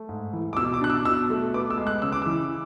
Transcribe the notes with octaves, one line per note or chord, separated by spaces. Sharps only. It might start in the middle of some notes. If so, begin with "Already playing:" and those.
Already playing: A3
G#2
E3
D6
B2 E6
D6
D4 F#6
E6
B2 E6
A3
B3 D6
E6
G#3
F#6
C#3 E6
D6
E3 E6